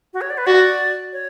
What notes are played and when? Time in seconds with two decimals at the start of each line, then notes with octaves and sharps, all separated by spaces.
0.14 F#4
0.21 C#5
0.30 D5
0.38 B4
0.46 F#4 D5
1.13 C#5